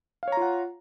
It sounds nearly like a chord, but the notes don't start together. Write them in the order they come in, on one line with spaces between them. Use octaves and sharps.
F5 C#5 A#5 F4 F#5